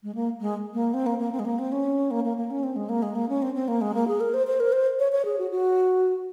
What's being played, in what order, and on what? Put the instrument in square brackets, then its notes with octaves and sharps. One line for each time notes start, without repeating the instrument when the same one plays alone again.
[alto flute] G#3
A#3
G#3
A#3
C4
A#3
A#3
C4
G#3
A#3
C4
C#4
A#3
A#3
A#3
C#4
C4
G#3
A#3
G#3
A#3
C#4
C4
C4
A#3
G#3
A#3
G#4
A#4
C5
C5
A#4
C5
C#5
C#5
G#4
F#4
F#4